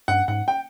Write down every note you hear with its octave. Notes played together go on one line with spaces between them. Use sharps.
G2 F#5
G#2 F#5
G5